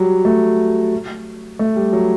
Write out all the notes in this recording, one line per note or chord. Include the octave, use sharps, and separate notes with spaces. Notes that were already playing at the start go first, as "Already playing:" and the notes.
Already playing: F#3 G3
A3
A3
G3
F#3